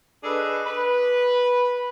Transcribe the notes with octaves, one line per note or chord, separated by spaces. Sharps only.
D4 G#4 A4 B4 D#5
B4